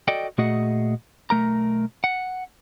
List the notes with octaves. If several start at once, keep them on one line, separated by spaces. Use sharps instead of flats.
F#4 A4 D5 D#5 G5
A#2 A3 F#4 G#4 D#5 F#5
B1 A3 A#4 A#5
F#5